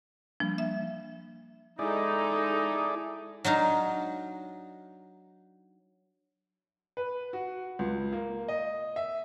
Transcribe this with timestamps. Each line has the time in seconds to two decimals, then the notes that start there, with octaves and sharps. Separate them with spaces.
0.40 F3 G3 A#3 D4
0.58 E5
1.79 G#3 D#4 E4 G#4 A4 D5
3.45 F#3 D4 D#4 F5
6.97 B4
7.33 F#4
7.79 C#2
8.13 A#3
8.48 D#5
8.96 E5